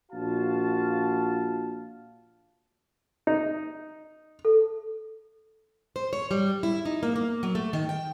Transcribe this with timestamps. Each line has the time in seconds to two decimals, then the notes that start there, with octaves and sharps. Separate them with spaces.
0.11 A#1 F4 F#4 F5 A5
3.27 D#4
4.45 A4
5.96 C5
6.13 C#5
6.31 G3
6.63 E4
6.85 D#4
7.03 A#3
7.16 A#3
7.43 F#3
7.55 A3
7.73 D#3
7.89 G5